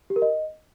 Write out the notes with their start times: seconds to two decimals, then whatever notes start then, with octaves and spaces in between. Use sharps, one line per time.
0.10 G4
0.16 A#4
0.22 D#5